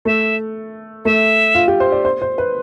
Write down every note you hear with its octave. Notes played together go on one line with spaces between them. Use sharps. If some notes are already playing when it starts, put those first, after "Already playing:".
A3 E5
A3 E5
F4
G4
C5
D5
C5
C5
B4